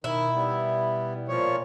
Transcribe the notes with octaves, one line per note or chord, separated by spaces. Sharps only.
B2 D#3 E4
G3 B3
A#2 F3 C#5